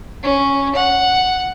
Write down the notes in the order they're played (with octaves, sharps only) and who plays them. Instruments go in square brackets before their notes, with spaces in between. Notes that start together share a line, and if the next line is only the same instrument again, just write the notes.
[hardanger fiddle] C#4
F#5